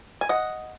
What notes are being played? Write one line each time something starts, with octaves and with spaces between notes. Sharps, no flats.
G#5
D#5 F#5